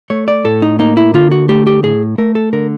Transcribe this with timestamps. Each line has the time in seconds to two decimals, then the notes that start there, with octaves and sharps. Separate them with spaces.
0.10 A3 C#5
0.28 D5
0.44 A2 A4
0.62 D#4
0.79 A#3 D#4
0.97 E4
1.14 D3 F4
1.31 F#4
1.49 A3 G4
1.67 G4
1.83 A2 G#4
2.18 A3 A#4
2.35 A4
2.53 D3 A#4